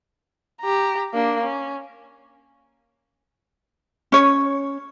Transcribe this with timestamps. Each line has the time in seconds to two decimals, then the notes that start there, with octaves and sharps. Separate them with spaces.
0.61 G4 A#5
1.13 A#3 D4
1.43 C#4
4.12 C#4 C#5